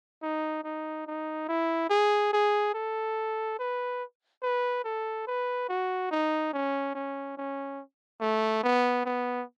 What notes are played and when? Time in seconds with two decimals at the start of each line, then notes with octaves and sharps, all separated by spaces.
0.23 D#4
0.64 D#4
1.07 D#4
1.49 E4
1.90 G#4
2.33 G#4
2.74 A4
3.59 B4
4.43 B4
4.84 A4
5.27 B4
5.69 F#4
6.11 D#4
6.53 C#4
6.95 C#4
7.38 C#4
8.21 A3
8.64 B3
9.06 B3